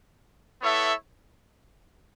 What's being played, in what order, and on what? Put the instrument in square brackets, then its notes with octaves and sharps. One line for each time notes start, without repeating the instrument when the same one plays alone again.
[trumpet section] B3 E4 A4 C#5 E5